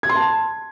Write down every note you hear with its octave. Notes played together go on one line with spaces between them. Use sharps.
G#6
C6
A5